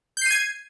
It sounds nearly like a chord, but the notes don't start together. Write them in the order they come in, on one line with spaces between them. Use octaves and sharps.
G6 C7 D#7 G#6